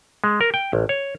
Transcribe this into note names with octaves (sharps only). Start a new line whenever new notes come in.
G#3
A#4
G5
A1
C#5